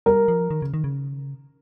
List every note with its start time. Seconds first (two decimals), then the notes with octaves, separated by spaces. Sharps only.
0.06 G3 A#4
0.28 F3
0.51 D#3
0.62 C#3
0.74 D#3
0.84 C#3